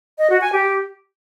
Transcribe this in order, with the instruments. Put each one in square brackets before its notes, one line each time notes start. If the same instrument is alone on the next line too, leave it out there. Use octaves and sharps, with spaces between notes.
[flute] D#5
F#4
G#5
G4